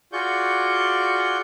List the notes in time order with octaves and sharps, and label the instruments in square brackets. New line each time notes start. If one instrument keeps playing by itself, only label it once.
[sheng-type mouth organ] F4 F#4 G#4 D5 C#6 G6